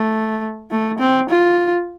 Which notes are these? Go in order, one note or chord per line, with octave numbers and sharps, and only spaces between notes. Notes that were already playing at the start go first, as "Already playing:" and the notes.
Already playing: A3
A3
C4
F4